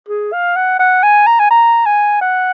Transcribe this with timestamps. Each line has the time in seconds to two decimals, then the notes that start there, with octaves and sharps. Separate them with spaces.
0.08 G#4
0.32 F5
0.56 F#5
0.79 F#5
1.03 G#5
1.26 A#5
1.39 G#5
1.51 A#5
1.86 G#5
2.21 F#5